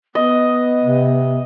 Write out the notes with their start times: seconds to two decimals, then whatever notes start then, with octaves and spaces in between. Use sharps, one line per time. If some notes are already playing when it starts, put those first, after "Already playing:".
0.15 B3 D#5
0.82 C3